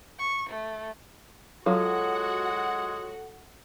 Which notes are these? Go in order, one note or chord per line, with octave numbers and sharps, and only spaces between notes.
C#6
A3
F#3 G#3 F4 F#4 A4 F#5